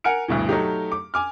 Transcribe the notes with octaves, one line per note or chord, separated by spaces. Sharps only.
A#4 F#5 G#5 F6 C#7 D7
D2 G2 B2 E3
F#3 A3 D#4 G4
D6
G#5 D6 F6